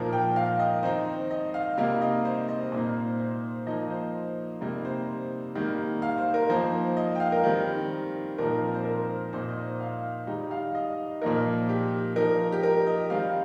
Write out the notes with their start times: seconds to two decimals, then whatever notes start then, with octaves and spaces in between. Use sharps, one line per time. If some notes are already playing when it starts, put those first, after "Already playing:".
Already playing: A#2 F3 A#3 D#4 A#4
0.13 G5
0.36 F5
0.59 D#5
0.83 D#3 C4 D#4 C5
1.31 D#5
1.54 F5
1.77 C3 G3 A#3 D#4 F5
2.02 D#5
2.25 C5
2.49 D#5
2.72 A#2 A#3 D#4 C5
3.19 C5
3.67 F3 A#3 D#4 D#5
3.90 C5
4.61 C3 G3 A#3 D#4
4.85 C5
5.55 D#3 G3 A#3 D#4
6.02 F5
6.18 C5
6.34 A#4
6.49 F3 A#3 D#4 C5
6.97 D#5
7.15 G5
7.20 F5
7.32 A#4
7.44 D#3 G3 C4
8.38 A#2 F3 C4 D#4 A#4
8.74 C5
8.85 A#4
9.33 A#2 A#3 D#4 C5
9.49 D#5
9.80 F5
10.27 D#3 G3 D#4
10.51 F5
10.75 D#5
11.21 A#2 F3 A#3 D#4 A#4
11.69 G4
12.16 F3 D#4 A#4
12.52 G4
12.63 A#4
12.87 D#5
13.10 D#3 G3 C4 F5